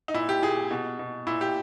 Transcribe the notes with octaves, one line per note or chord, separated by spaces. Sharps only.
D#4
A#2 E4
G4
A#2 G#4
B2
B2
A#2 E4
G4